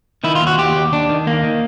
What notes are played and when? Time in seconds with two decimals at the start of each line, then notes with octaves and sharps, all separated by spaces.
0.24 D#3 E4
0.35 F4
0.41 D#2
0.47 F#4
0.58 D#2 G4
0.76 D#2
0.92 D#2 D4
1.09 D#3
1.27 D#2 A#3
1.43 D#3